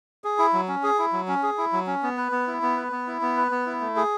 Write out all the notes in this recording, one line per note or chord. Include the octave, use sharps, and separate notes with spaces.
G#4
E4
F#3
C#4
G#4
E4
F#3
C#4
G#4
E4
F#3
C#4
B3
B4
B3
E4
B3
B4
B3
E4
B3
B4
B3
E4
A3
G#4